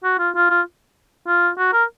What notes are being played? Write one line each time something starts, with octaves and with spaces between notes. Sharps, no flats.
F#4
F4
F4
F4
F4
F#4
A#4